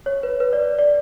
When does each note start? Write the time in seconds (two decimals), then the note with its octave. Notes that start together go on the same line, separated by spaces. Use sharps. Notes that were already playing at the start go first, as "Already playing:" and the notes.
0.06 C#5
0.23 B4
0.40 B4
0.53 D5
0.79 D5